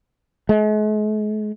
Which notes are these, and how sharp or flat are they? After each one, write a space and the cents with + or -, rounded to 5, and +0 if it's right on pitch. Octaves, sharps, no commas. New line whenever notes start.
G#3 +45